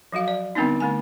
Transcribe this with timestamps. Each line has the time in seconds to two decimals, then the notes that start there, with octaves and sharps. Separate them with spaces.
0.12 F3 F#3 F#4 F5
0.28 D5
0.55 D3 G3 B3 C4 D4 D#4
0.80 D3 A3 G#5